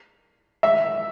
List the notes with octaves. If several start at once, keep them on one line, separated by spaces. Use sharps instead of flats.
E5